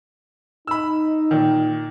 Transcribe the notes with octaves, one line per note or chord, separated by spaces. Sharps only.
D#4 B5 E6
A#2 D#3